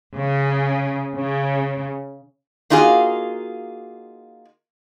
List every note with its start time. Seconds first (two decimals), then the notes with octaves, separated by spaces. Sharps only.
0.16 C#3
1.15 C#3
2.70 A#3 D#4 F4 F#4 G#4